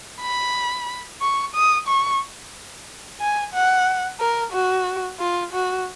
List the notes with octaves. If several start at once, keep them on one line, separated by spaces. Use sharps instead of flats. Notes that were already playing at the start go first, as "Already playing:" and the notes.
B5
C#6
D#6
C#6
G#5
F#5
A#4
F#4
F4
F#4